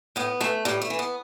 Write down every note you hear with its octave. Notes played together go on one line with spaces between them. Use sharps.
A2 B3
E3 A3
A2 G3
A3
E3
B3